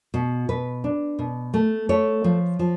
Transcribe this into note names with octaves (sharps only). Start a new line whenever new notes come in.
B2
B2 B4
D4
B2
A3
A3 C#5
F3
F3